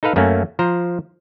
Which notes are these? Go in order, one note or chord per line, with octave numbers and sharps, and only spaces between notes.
D#4 A4 B4 F5
F#2 A3 A#3 C#4
F3 C5 A#5